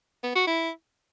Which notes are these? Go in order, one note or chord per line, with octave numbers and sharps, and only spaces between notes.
B3
F#4
E4